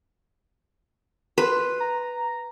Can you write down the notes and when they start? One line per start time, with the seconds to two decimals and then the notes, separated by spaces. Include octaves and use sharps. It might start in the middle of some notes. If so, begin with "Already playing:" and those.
1.38 B4 C6
1.80 A#5